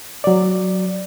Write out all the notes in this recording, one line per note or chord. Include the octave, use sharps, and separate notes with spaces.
F#3 D5